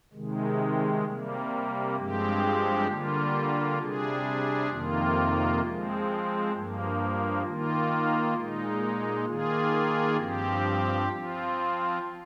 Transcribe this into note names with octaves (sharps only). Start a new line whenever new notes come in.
C3 D#3 G#3
C3 G3 A#3
G2 F3 G#3 C4 G4
D3 G3 A#3 F4
C3 G3 D4 G#4
F2 C3 D#3 A#3 F4
F3 G#3 C4
G2 F3 A#3
D#3 A#3 F4
A#2 G#3 D#4
D#3 A#3 F4 G#4
G2 F3 C4 G4
F3 C4 F4